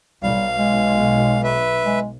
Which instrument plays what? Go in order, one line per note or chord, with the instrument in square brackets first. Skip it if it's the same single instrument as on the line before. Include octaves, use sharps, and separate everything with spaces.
[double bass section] B1 [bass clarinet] G3 [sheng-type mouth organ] F5
[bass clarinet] G#3
[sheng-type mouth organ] B4 E5
[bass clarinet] G#3